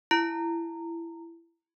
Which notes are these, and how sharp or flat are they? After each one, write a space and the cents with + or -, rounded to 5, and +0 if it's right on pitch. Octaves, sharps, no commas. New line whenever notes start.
E4 +20 A#5 -20